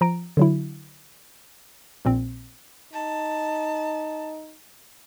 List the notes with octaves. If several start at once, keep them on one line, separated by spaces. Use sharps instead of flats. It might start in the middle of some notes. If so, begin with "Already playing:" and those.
F3 A#5 D7
D3 F#3 E4
A#1 A#2 C4
D#4 A5